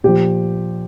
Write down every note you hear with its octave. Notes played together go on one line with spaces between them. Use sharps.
A#2 F3 G4